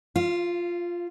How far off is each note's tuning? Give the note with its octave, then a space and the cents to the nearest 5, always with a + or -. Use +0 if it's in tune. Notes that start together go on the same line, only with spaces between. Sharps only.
F4 +0 F5 -30